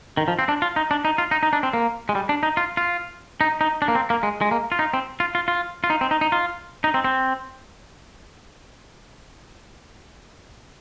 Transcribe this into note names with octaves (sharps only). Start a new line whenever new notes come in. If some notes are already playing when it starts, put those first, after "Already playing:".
D#3
F3
C4
D4
F4
D#4
D4
D#4
F4
D#4
D#4
D4
C4
A#3
G#3
G3
D4
D#4
F4
F4
D#4
D#4
D4
A#3
C4
A#3
G#3
G#3
A#3
F4
D#4
C4
F4
F4
F4
F4
D#4
C4
D#4
D#4
F4
D#4
C4
C4